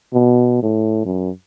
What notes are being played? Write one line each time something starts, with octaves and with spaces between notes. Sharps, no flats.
B2
A2
F#2